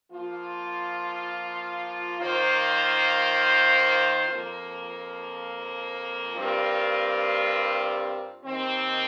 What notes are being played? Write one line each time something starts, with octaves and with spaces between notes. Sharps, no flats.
F3 A#3 F4
D#3 A#3 F4 C5
F2 F3 A#3
G2 G3 C4 F4 A#4
D#2 D#3 C4